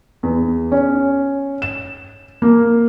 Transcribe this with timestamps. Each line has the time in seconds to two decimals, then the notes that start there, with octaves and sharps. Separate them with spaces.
0.23 E2
0.72 C#4
1.62 E7
2.42 A#3